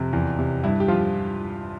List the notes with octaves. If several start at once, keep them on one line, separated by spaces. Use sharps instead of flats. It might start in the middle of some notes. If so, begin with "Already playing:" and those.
Already playing: F2 C3
E2
C3
G2 E4
G4
F3 F4